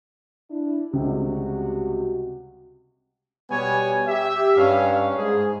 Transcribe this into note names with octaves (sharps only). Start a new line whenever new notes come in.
D4 E4
C#2 C3 G3 F#4
B2 G3 B3 C#5 G#5
G4 E5
G2 C#4 F5
G#2 G#4